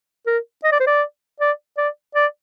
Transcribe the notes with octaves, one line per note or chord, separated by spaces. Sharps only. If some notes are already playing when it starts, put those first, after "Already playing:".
A#4
D#5
D5
C5
D5
D5
D5
D5